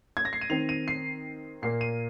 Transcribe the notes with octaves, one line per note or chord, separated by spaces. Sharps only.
G#6
A#6
C7
D#7
D#3 C4 F7
D#7
C7
A#2 A#3 C7
D#7